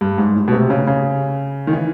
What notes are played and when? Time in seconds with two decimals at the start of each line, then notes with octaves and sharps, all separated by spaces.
0.01 G2
0.18 G#2
0.36 A2
0.48 B2
0.52 C3
0.70 C#3
0.87 C#3
1.67 D#3
1.73 E3